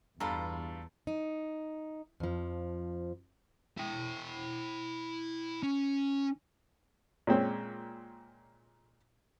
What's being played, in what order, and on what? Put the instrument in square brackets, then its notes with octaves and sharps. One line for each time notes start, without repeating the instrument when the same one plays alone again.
[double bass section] E2 [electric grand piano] G2 F5 B5 [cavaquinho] F4 A4 A#5
[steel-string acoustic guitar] D#4
F2 F3
[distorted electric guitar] E4 G5
C#4
[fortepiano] A#2 G#3 C4 C#4